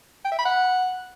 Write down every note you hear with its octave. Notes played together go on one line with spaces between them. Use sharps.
G5
E5
B5
F#5